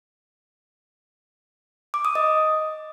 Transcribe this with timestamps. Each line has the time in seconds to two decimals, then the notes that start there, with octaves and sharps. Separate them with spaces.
1.94 D6
2.05 D#6
2.15 D#5